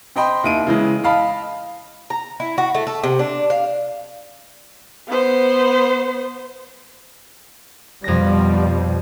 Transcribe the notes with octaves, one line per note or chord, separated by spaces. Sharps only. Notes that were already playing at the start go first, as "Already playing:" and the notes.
C4 D#5 G5 B5 C6
D#2 E4 D7 D#7
C#3 E3 G#3
D#5 F5 A5 B5
A#5
E4
F#4
A3
A4
C3
D4
F5
B3 C5
F2 B2 F3 G3 A#6